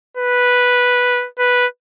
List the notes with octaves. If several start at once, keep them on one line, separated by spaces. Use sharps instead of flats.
B4
B4